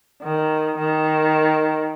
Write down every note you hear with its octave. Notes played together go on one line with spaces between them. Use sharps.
D#3
D#3